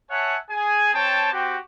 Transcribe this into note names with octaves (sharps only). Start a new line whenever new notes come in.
C#5 E5 F#5 G#5 A5
G#4 G#5
C4 C#5 G5 A5
C4 F#4 G4